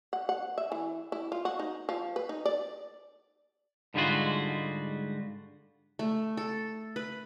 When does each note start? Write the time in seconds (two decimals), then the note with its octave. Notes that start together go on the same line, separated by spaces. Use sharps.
0.13 F#5
0.29 F#5
0.58 E5
0.72 E3
1.12 E4
1.32 F4
1.45 F#4
1.59 D#4
1.89 F3
2.16 B4
2.29 D#4
2.45 D5
3.94 G#2 D3 G3 G#3 F4 F#4
5.99 A3
6.37 A4
6.96 B4